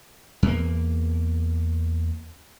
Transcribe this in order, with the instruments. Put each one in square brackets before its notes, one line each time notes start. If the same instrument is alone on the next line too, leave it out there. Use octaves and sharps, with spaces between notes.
[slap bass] E2 A#3